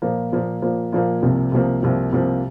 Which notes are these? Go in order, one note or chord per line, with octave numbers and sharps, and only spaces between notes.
A#2 F3 A#3
A#2 F3 A#3
A#2 F3 A#3
A#2 F3 A#3
C2 C3 F3 A#3
C2 C3 F3 A#3
C2 C3 F3 A#3
C2 C3 F3 A#3